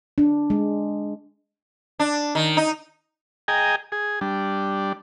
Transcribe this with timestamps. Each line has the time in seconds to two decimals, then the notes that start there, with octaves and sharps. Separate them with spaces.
0.18 D4
0.50 G#3
1.99 D4
2.35 D#3
2.57 D#4
3.48 G#4 D#5 G5 G#5 A#5
3.92 G#4
4.21 G3 D4